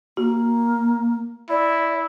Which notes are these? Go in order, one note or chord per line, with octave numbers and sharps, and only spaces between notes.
A#3 F#4
E4 D5